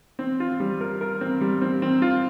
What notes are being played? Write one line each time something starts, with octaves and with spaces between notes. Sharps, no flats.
C4
F4
G3
A#4
A#4
C4
G3
C4
C4
F4